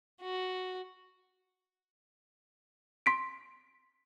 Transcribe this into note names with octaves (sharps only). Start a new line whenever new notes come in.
F#4
C6 B6 D7